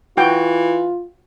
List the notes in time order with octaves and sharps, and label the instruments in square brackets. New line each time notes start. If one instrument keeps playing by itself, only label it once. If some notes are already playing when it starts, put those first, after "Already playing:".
[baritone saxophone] E3 [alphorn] F4 [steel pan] F#4 G5